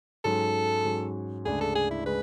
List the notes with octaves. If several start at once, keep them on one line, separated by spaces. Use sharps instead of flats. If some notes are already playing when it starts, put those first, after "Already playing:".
G#2 F#3 C#4 A4
G#2 F#3 C#4
D2 C#3 G#3 D4 G#4
A4
G#4
E4
C#3 G#3 B4